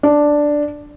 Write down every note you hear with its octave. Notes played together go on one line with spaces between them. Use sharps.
D4